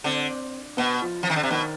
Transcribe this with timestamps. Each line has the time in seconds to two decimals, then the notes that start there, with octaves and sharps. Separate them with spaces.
0.04 D3 C4
0.77 B2 B3
1.02 F3
1.23 F3
1.30 D#3
1.36 D3
1.43 C3
1.51 B2 D#3